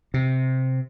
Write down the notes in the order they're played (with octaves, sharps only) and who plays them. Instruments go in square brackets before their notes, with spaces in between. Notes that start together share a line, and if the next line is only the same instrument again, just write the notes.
[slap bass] C3